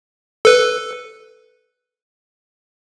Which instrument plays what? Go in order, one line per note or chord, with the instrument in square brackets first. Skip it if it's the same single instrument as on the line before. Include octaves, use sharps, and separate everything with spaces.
[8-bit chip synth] A4 B4